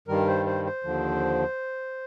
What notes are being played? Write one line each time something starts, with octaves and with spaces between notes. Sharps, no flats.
G2 D#3 G3 A#4
C5
C5
C5
D#2 D3 F3